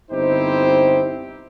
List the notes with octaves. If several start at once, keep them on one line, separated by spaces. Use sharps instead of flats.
G1 C4 D#4 E4 G4 C5